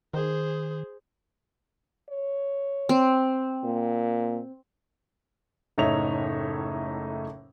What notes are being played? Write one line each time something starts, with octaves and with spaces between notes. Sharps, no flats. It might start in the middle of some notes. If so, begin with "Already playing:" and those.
D#3 G#4 C5
C#5
C4
A#2
F#1 A2 D#4 C#5 E5 F7